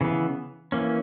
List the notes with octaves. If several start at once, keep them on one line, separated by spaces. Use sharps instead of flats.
C#3 E3 B3
E3 A#3 C#4